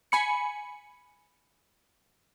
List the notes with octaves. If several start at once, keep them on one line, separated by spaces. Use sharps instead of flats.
G#5 B5 C#7